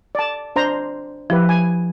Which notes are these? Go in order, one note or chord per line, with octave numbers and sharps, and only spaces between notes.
D5 A5
D4 C5 A#5
F3 E4 G4 B4
G#5